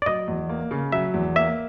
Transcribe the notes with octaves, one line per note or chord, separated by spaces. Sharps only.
D5
F#3 D#5
E2
A#3
C#3
F#3 E5
E2
A#3 E5